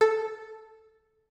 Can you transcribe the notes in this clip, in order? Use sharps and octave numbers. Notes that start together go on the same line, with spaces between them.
A4